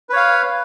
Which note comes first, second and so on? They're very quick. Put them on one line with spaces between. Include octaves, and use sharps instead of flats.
B4 C#5 F5